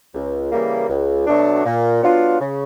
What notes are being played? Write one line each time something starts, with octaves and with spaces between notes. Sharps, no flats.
C#2
C#3 E3 G3 A#3
C#2
B2 F#3 A3 D4
A#2
F#3 B3 D4 F4
C#3